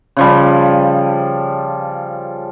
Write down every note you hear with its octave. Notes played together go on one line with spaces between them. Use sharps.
C#3 F3 G3